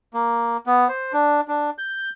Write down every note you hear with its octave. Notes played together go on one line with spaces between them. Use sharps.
A#3
B3
C5
D4
D4
G6